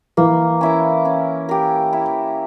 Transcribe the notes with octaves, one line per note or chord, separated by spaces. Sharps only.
E3 A#3
C#4 E4 A#4
C#4
G4 A#4
E4